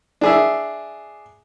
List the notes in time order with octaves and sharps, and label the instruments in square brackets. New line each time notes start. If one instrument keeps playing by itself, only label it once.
[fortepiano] D4 G#4 E5